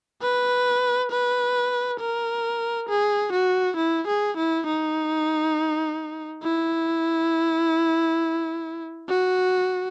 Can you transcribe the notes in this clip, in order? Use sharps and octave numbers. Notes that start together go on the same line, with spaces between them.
B4
B4
A#4
G#4
F#4
E4
G#4
E4
D#4
E4
F#4